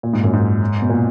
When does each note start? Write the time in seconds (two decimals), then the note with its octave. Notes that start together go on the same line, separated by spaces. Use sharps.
0.03 A#2
0.13 G#2
0.24 F#2
0.33 G#2
0.82 B2
0.89 A#2